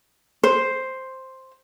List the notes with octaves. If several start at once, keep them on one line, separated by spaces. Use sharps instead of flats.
C5